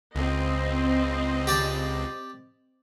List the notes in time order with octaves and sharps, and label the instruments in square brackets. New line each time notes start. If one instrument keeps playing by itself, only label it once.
[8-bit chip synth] C#2 [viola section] C4 D#5
[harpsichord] G4 D5 A5